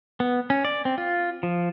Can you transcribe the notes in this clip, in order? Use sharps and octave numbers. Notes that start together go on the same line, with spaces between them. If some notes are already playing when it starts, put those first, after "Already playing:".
B3
C#4
D5
C4
F4
F3